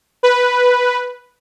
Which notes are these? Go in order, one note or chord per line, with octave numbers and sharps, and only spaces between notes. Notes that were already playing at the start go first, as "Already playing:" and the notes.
B4